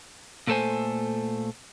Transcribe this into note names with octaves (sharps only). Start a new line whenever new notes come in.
A#2 A3 A4 C5 G#5